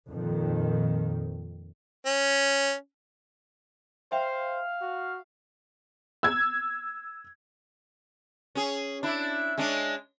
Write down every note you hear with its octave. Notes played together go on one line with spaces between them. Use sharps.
F2 A#2 D#3
C#4
C5 E5 F5 G5
F#4
E6 G#6
C#4 G#4
D4 E4
G#3 C#4 D4